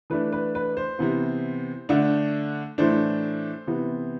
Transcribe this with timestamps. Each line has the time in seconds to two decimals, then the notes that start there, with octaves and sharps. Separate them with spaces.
0.10 E3 A3 D4 B4
0.32 B4
0.55 B4
0.77 C5
0.99 C3 E3 B3
1.89 D3 A3 D4
2.78 A2 E3 A3 D4 C5
3.67 C3 E3 B3